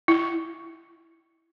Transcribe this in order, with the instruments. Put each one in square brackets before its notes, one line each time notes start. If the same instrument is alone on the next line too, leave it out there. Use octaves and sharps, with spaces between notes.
[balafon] E4